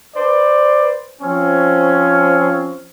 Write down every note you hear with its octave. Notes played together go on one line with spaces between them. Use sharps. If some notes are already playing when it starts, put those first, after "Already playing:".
B4 C5 D5
F3 C4 C#4